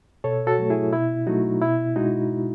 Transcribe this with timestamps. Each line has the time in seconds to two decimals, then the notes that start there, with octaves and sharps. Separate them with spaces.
0.24 B2 A4 C#5
0.47 F#4 A4
0.58 F#3 A3
0.70 E4 G#4
0.93 B2 E4
1.27 F#3 A3 D#4 F#4
1.62 B2 E4
1.96 G#3 D#4 F#4